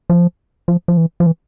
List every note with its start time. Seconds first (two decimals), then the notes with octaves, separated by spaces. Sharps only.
0.10 F3
0.68 F3
0.88 F3
0.97 E3
1.20 F3
1.26 E3